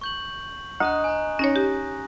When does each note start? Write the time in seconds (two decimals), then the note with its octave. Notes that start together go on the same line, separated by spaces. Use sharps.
0.01 C#6 G6 F#7
0.80 D2 D#5 A#5 D#6 F#6
1.04 G#5 A#5
1.39 C#4 D#4 C#5 A#6
1.56 G4